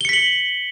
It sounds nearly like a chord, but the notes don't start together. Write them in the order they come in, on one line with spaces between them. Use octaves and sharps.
G7 C#7 B6 F#7